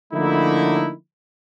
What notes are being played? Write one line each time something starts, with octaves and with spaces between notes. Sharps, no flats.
D3 F3 A3 A#3 D#4 E4